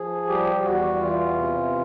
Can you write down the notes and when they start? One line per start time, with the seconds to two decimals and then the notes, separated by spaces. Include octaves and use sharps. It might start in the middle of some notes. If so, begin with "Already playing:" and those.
Already playing: F3 G#4
0.28 G3 G4
0.64 E2 F#4
1.01 E3 F4
1.37 C3